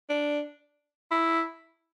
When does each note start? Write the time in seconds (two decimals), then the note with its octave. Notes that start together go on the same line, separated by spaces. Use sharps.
0.09 D4
1.11 E4